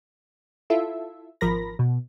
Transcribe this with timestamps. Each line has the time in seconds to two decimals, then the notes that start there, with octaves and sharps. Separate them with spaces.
0.70 E4 F4 A4 E5
1.41 G#1 F3 A#4 B5 A#6
1.79 B2